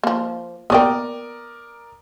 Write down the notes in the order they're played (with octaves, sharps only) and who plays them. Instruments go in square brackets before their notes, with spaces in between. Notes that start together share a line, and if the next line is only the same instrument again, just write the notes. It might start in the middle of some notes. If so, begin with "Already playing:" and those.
[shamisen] F3 A#3
[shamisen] B3 C#5 G5 [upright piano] A#4 D5 D#6